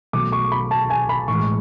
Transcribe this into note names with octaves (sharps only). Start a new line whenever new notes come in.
B2 F#3 A3 D6
C#6
B5
A5
G#5
B5
A2 E3 G#3 C#6